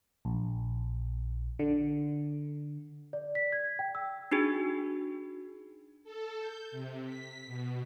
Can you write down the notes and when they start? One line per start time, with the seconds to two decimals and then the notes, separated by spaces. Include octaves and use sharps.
0.25 A#1
1.59 D3
3.13 D5
3.35 B6
3.52 G#6
3.79 G5
3.95 E6
4.31 D4 D#4 F#4 G#4
6.04 A4
6.39 G6
6.71 C3
7.05 B6
7.46 B2